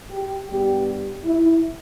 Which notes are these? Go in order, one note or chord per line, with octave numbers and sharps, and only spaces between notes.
G4
G2 G3 B3 G4
E4